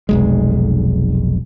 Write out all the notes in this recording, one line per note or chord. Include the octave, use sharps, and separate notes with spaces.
F1 B1 G#3